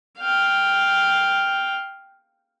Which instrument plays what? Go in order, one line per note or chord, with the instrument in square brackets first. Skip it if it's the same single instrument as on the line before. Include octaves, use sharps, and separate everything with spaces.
[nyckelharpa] F5 G5